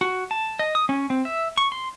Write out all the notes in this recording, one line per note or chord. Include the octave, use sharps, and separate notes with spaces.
F#4
A5
D#5
D#6
C#4
C4
E5
C#6
C6